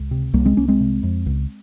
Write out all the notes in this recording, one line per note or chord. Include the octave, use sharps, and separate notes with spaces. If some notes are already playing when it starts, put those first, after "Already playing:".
Already playing: C#2
C3
C2 G3 A#3
G#3 C4
C2 A#3 C#4
G#3 C4
C3
F2
C#2